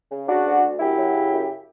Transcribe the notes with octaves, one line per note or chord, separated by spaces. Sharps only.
C#3
C#3 D4 F#4
D2
D2
F#2 E4 G4
F#3
C#3
F#2